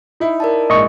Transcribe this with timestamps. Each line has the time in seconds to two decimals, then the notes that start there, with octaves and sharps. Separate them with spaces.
0.20 D#4 E4
0.40 A#4 D5 A5
0.70 A#1 G#2 D#5 C#6